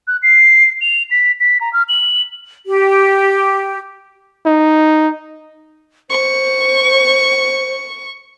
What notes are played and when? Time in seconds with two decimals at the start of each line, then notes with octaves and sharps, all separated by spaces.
0.08 F#6
0.23 C7
0.81 F7
1.11 B6
1.40 B6
1.61 A#5
1.73 F6
1.89 F#7
2.67 G4
4.46 D#4
6.10 C5 C#6